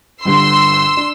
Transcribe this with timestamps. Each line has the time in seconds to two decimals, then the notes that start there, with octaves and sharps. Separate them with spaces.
0.25 G1 G2 D3 C6 E6
0.97 D4